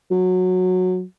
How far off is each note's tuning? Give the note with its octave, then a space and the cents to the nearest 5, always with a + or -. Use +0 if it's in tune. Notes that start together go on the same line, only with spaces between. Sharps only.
F#3 -15